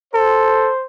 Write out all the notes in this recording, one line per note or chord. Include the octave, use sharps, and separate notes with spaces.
A4 C5